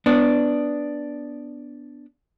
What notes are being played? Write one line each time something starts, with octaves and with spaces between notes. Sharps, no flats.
B3 D4